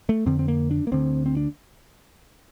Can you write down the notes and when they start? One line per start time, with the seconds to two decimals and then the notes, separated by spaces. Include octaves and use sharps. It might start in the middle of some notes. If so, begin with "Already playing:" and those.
0.09 A3
0.26 F2 D3 C4
0.39 C4
0.48 A#3
0.71 D4
0.87 A#3
0.92 D2 D3 C4
1.26 C4
1.37 D4